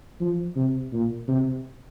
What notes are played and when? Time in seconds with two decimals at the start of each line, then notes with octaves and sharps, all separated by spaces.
0.21 F3
0.56 C3
0.93 A#2
1.28 C3